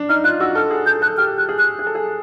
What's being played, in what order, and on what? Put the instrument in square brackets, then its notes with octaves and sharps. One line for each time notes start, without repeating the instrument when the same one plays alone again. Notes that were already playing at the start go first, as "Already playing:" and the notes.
Already playing: [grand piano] D4
[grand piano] D#4 [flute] F6
[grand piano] F4 [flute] F#6
[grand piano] F#4 [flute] E6
[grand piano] A4 [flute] F6
[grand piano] G#4
[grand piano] A4 [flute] G6
[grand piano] A4 [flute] F#6
[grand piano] G4 [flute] F6
[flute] F#6
[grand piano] G#4
[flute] F#6
[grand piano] G#4
A4
G#4